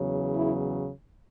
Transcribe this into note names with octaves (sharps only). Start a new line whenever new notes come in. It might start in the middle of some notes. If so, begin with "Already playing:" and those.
Already playing: E2 C#3 F#3
E4